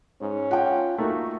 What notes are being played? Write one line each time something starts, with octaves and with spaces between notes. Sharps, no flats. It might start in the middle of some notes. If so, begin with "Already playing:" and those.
G#2 C#4
F4 F#5 G5
A3 A#3 D#4 F#4